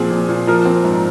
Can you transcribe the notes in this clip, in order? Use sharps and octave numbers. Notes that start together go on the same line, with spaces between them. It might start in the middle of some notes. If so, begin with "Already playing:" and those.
Already playing: A#2 F3 C4 G#4
A#2
A#2
F3 A#4
C4
G#2